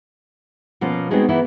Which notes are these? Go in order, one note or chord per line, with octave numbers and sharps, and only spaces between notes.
B2 F3 A#3 C#4 F4
G#3 B3 C4 D#4 F#4 G#4
E3 A#3 B3 E4